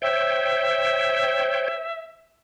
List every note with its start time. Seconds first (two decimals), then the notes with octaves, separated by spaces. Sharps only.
0.02 C5 C#5 E5 G5